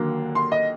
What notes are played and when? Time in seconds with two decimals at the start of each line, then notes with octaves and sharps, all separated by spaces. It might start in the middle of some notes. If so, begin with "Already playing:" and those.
Already playing: D#2 D3 F#3 A#3
0.35 C6
0.52 D#5